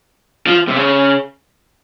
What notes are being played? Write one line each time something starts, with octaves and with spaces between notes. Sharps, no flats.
F3
C3
C#3